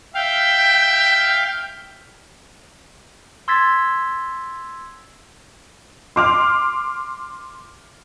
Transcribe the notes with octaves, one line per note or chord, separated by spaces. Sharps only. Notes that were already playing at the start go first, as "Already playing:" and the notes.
E5 F5 G5
C6 E6 G#6 A6 B6
C6 D6 F6